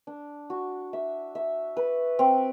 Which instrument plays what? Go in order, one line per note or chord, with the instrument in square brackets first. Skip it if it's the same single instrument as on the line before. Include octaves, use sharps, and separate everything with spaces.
[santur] D4
F#4
E5
E5
B4
C4